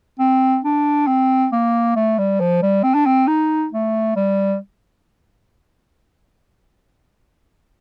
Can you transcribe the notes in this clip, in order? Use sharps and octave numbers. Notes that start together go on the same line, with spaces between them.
C4
D4
C4
A#3
A3
G3
F3
G3
C4
D4
C4
D#4
A3
G3